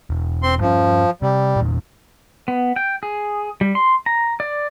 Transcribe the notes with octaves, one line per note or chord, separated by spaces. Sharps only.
E1
C4 C6
G2 F3 C#4
C3 G3
E2 A#2
B3
G5
G#4
G3
C6
A#5
D5